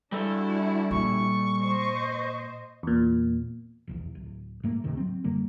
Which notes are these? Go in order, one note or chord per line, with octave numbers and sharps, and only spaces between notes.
G3 D4 E4 F#4 A4
A#2 C#6
C5 D#5
E2 A#2
F1 B1 E2
D1
G#2 A3 A#3
D2 G#2 C3 D#3
F#3 C4
F#2 D3 G3 A#3